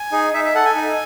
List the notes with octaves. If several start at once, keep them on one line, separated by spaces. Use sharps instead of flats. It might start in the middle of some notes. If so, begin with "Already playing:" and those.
Already playing: G#5
D#4 G#4
D#4 E5
E5
A4 F#5
G#5
D#4